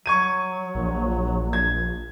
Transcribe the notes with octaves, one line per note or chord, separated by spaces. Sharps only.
F#3 C#6 G#6 D#7
A#1
G#6